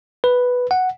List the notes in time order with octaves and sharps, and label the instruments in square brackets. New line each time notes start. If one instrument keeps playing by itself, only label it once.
[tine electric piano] B4
F#5